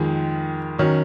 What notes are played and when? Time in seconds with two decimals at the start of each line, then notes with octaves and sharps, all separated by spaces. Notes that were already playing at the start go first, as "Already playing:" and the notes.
Already playing: F2 D#3 G#3
0.78 D#3 F#3 C#4